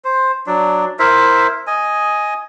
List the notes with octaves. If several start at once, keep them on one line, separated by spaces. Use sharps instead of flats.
C5
F#3 D4
E4 A#4 C5 E5
D#5 G#5